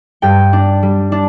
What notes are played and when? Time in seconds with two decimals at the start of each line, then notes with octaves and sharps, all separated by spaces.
0.22 G2 G5
0.53 D4
0.83 G3
1.12 D4